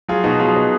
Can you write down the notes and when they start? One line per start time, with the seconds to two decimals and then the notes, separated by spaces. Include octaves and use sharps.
0.08 F#3 F4 G#4
0.24 B2 D#4 F#4
0.40 F#3 F4 G#4
0.56 B2